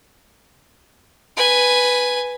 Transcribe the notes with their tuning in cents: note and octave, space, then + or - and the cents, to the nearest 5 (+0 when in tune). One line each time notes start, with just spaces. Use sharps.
B4 +0 G#5 +0